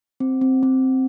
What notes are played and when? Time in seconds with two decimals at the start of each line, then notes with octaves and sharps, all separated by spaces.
0.20 C4
0.41 C4
0.63 C4